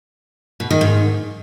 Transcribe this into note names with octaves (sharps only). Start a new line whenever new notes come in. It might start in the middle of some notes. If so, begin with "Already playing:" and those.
B2
D#3
G#2